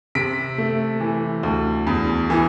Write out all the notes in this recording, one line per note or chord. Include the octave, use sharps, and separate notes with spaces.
C3 B6 D7
A3
E3
D2
E2
E3